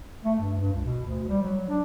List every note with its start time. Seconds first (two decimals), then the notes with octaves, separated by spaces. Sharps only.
0.25 A3
0.39 G2
0.58 G2
0.73 C#2
0.84 B2
1.06 D2
1.28 G3
1.41 F#3
1.69 D4